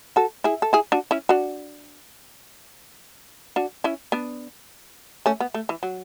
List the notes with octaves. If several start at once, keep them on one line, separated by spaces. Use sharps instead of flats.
F#4 A4
E4 G#4
A4
E4 G#4
D4 F#4
C#4 E4
D4 F#4
D4 F#4
C#4 E4
B3 D4
A3 C#4
B3
A3
E3
F#3